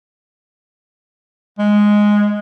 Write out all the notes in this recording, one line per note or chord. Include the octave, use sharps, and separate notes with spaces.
G#3